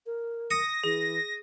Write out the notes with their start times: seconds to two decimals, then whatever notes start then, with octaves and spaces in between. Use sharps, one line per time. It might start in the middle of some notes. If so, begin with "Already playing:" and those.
0.06 A#4
0.51 D#6 A#6 C#7
0.84 E3 G#4